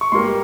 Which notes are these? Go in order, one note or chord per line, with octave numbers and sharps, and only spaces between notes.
C#6
G#2 G3 A#3 C6